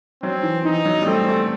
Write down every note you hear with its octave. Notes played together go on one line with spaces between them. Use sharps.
F#3 C4
E3
E3 D#4
F#3
G3
A3 C4
A3